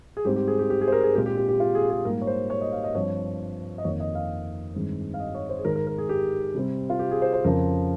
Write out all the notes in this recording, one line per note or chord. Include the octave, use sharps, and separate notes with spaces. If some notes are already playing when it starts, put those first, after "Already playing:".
G#4
G#2 G3 C4 G4
G4
G#4
G4
G4
G#4
C5
A#4
G#4
A#2 G#3 C4 G4
G4
G4
G4
F4
G#4
G#4
G#2 G3 A#3 A#4
C#5
C5
C#5
D#5
F5
D#5
G2 F3 C4 C#5
D#5
F2 D#3 A#3 C#5
D#5
F5
G2 D#3 G#3 C4
F5
D#5
C#5
C5
G#4
G#2 D#3 G#3 A#4
A#4
A#4
G#4
G4
C3 G3 C4
F4
G4
G#4
C5
C5
F2 C#3 F3 A#4